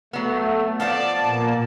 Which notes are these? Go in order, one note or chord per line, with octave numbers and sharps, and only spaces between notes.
F#3 A3 B3
F3 B3 D5 F5 A5
A#2 A#3